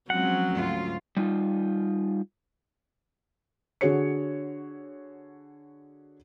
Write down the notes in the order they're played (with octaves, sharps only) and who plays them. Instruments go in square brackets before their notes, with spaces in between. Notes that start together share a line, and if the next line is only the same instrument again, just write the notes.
[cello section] F3 G#3 C4 [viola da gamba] F#3 C#4 [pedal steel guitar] F#5
[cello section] D2 G#2 F4
[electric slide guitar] G3 D#4 F4
[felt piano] D3 F#4 G#4 C#5 C#7